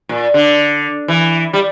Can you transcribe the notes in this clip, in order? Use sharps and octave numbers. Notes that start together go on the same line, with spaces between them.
A#2
D3
E3
G3